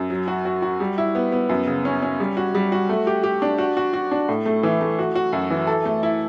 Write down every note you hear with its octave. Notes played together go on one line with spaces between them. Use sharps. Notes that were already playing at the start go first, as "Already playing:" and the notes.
Already playing: F#2
F#3
F#4
F#4
F#4
G3
E4
B3
B3
F#2
C#3
C#4
C#4
G3
F#4
G3
F#4
A3
G4
G4
D4
F#4
F#4
F#4
D4
A2
A3
E3
A3
F#4
F#4
F#2
E3
A4
A3
E4